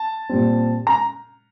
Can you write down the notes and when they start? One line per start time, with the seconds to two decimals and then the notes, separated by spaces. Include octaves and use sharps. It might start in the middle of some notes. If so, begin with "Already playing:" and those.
Already playing: A5
0.29 A#2 G3 C4
0.87 A#5